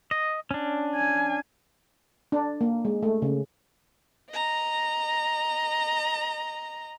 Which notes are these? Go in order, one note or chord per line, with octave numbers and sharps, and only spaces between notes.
D#5
C#4 D4
G#5
D4
A#3
G#3
A3
C#3
D#5 A#5